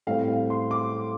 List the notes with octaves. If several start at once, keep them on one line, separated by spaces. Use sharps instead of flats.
A2 G3 C4 F5
F5
C6
D6